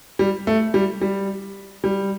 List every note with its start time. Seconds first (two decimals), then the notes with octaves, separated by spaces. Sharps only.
0.19 G3
0.47 A3
0.74 G3
1.01 G3
1.84 G3